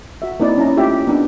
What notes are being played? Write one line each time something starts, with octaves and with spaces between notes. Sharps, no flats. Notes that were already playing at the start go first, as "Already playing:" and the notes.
F#4 E5
A#3 C4 D#4 E4 D5
C#4 D#4 E4 A5 A#5
A3 F4 G4 E5
B3 D4 D#4